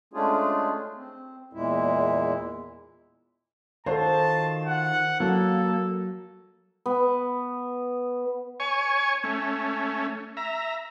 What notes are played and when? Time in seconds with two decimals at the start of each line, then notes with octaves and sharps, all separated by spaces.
0.13 G#3 A3 C#4 D4 F4 G#4
0.96 C4
1.53 E2 A#2 G#3 E4
3.86 D#3 F4 F#4 A4 C5 A5
4.66 F#5
5.20 F#3 A#3 A4
6.86 B3
8.60 C#5 G#5 C#6
9.24 A3 C#4
10.37 E5 A#5